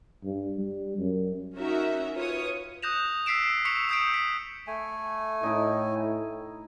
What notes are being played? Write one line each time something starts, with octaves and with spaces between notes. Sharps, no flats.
G2
G3
F#2
C#4 D#4 F#4 A#4 E5
F4 B4 C#5 D#6
D#6 F#6 G6 A#6 E7 F7
E6 B6 C7 D7 E7
C#6 B6 C#7 F7
D#6 E6 G6 C7 D7
B6
A3 G#5
A2 D#4 E4